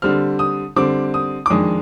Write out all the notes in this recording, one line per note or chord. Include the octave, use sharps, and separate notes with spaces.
D3 G3 C4 F6
D#6
D3 G3 C4 D6
D#6
D6
F2 D#3 G#3 D4 D#6